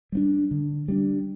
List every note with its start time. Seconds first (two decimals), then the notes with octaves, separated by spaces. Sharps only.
0.12 G3 B3 D4
0.51 D3
0.88 G3 B3 D4